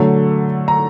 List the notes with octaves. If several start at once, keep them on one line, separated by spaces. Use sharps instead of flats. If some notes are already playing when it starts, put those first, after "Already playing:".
Already playing: D3 F#3 A3
A#5